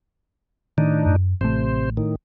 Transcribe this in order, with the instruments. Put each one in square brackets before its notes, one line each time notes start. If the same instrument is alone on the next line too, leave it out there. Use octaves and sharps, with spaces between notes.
[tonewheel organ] A2 D4 D#4 [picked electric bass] D#3
[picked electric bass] F#2
[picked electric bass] A1 A3 [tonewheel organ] C3 C5
[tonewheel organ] A2 D#3